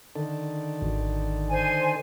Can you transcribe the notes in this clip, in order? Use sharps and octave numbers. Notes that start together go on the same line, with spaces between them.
D3 D#3 A4
G#1
C5 G#5